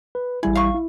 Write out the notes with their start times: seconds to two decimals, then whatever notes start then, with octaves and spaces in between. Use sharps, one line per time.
0.15 B4
0.43 A1 G3 E4 G#4
0.55 F5 C#6
0.74 E4